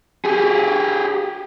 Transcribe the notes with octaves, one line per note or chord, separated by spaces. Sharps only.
G4 G#4